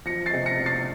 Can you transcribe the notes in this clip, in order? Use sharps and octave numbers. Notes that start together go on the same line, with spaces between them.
F3 A#6 C#7
A6 C7
C3
A#6 C#7
C3
A6 C7